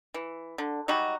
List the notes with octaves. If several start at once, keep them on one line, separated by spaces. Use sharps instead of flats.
E3
D3
F#3 G3 D#4 F#4